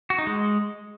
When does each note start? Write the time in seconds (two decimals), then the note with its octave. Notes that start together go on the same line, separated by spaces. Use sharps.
0.10 F#4
0.18 D#4
0.27 G#3